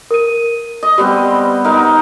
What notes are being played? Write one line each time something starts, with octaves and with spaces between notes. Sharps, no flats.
A#4 D#7
D#5
G3 B3 C4 G4
D#4 A#4 F#5